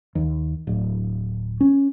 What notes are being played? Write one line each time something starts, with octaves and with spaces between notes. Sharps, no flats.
D#2
D1
C#4